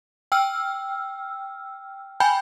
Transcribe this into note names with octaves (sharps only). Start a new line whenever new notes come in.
G5 E6 F6
G5 G#5 B5 G6